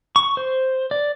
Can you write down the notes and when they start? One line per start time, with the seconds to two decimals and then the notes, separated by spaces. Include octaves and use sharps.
0.16 C#6
0.37 C5
0.91 D5